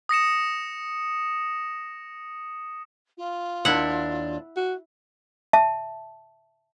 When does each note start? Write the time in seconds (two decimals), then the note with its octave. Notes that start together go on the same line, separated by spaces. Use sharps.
0.09 D#6 A#6 C#7 E7
3.18 F4
3.65 D#2 D4 E4 F#5
4.57 F#4
5.53 E5 A5